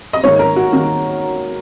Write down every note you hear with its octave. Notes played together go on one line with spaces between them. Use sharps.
D#5
G#2 D#3 A#3 C#5
A#4
F#4
D#3 A#3